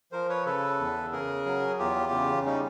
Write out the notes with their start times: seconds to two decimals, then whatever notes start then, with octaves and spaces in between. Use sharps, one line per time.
0.12 F3 A#4 C5
0.29 B4 C#5
0.46 C#3 A4 B4
0.79 E2
1.12 C#3 G#4 A#4
1.46 F#3
1.79 E2 F4 G4
2.12 C#3
2.45 G3 C#4 D#4